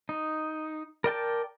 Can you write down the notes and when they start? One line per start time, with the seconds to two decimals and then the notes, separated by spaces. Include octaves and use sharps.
0.09 D#4
1.04 A#4 D5 G5 A5